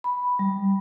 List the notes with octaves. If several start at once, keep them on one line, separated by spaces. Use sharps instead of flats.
B5
G3